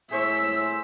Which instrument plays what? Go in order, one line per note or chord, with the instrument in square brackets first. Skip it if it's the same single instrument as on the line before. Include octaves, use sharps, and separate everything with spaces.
[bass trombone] A2 [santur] G#4 C5 C#6 [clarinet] E5 [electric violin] E6